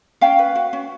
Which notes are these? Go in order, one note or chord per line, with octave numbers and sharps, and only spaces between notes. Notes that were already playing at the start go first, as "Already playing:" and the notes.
C#4 F5 G5
B4
F#4
C#4